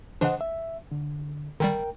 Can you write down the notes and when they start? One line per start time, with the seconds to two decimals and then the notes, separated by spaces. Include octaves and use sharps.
0.21 C#3 E3 D4 C5 D#5 F#5
0.41 E5
0.92 D3
1.60 D3 D#3 G3 A#4 G5